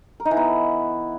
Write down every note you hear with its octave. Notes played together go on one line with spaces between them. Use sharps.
A#4
D#4
E3
B3